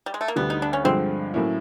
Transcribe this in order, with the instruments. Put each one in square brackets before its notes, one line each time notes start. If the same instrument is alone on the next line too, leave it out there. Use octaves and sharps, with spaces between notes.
[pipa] G3
G#3
A3
A#3
[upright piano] D2 D3 G3 [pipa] B3
[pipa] D#4
D4
C#4
[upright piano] G2 D3 F3 G#3 [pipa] C4
[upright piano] A2 F#3 A#3 C#4 E4